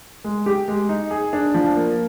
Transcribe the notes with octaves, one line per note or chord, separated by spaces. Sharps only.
G#3
G4
G#3
D#4
G#4
D4
F3
A#3